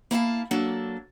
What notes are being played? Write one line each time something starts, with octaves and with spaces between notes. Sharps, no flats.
A#3 E4 F5 A5
F#3 A#3 D4 A4